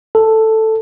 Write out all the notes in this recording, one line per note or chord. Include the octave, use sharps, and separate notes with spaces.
A4